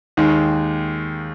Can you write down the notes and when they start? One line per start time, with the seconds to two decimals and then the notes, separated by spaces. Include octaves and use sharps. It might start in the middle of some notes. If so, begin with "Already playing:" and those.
0.17 D#2 D#3 G#3